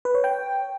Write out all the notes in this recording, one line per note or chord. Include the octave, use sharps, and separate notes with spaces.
B4
C#5
G5